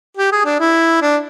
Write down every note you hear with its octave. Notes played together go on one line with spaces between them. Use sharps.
G4
G#4
D4
E4
D4